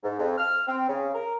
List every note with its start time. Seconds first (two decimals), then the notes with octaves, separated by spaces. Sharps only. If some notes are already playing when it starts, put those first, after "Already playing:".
0.03 G#2
0.19 F2
0.38 F6
0.67 C4
0.89 C#3
1.14 A#4